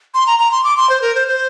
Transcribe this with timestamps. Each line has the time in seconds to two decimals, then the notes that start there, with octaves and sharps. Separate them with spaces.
0.14 C6
0.27 A#5
0.40 A#5
0.52 C6
0.64 D6
0.77 C6
0.90 C5
1.02 A#4
1.15 C5
1.28 C5